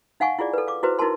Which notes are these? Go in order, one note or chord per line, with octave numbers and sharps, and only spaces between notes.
D#4 F5 F#5 G#5 C#6
E4 F4 G#4 D5
A4 B4
F5 D6
E4 F#4 B4 C5
D#4 E4 F#4 A#4 A5 C6